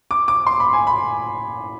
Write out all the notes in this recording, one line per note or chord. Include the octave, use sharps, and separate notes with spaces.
D6
D6
C6
B5
G#5
B5